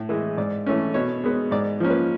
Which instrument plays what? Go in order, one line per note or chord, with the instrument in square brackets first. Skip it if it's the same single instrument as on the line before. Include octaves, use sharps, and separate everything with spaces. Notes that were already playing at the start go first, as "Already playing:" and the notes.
Already playing: [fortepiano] A2
E3 G#3
G#2 D5
E3 A3 C#4
B2 C#5
G#3 B3
G#2 D5
F3 A#3 C#4
B4